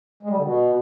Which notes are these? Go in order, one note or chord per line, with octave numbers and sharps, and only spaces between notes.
G#3
G3
D3
B2